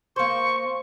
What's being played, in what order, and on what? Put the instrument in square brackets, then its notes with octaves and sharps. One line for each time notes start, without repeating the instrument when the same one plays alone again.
[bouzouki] A#3 C5 [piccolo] C#6